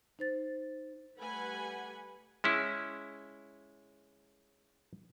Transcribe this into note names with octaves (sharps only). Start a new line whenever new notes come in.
D#4 C5 A6
G3 A3 B4 F#5 G#5 B5
G#3 C#4 E4